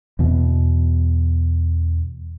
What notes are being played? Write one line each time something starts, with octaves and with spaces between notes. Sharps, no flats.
E2 B2